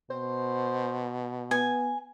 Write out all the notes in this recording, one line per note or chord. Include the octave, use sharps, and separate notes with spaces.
B2 C5
B3 G#5